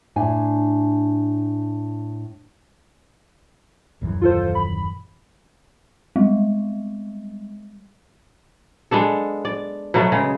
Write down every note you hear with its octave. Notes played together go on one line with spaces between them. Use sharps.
A2 D4 G#5
D#1 F#2 E3
F4 A4 C5
B5
G3 G#3
G#3 B3 D4 A4
D5
B2 F#3 A3 B3
C#3 G#3